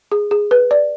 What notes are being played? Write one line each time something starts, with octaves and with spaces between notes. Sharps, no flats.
G#4
G#4
B4
D5